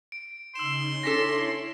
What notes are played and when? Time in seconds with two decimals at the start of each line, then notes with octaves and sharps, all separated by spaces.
0.12 D7
0.55 C#3 D#4 C6 E6 E7
1.03 C#4 D4 E4 A4 C#5 A#6 B6 E7